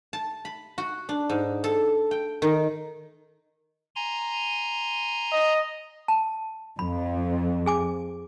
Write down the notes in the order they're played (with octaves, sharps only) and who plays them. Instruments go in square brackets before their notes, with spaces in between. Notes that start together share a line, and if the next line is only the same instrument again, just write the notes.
[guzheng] A5
B5
F#4
D4
G#2
A4
G5
D#3
[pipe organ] G#5 A#5 C6
[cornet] D#5
[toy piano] A5
[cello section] F2 [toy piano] B5
[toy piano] G#4 G#5 D6